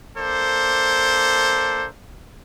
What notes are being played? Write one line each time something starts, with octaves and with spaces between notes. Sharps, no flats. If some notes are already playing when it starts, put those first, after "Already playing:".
A#3 D4 A4 C5